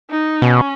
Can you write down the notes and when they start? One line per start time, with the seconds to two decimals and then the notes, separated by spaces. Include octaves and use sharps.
0.10 D#4
0.42 B2 C#4